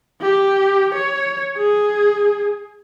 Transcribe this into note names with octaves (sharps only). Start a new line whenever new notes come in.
G4
C#5
G#4